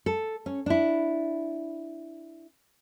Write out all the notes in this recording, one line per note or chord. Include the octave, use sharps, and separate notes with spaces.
A4
C#4
D4 E4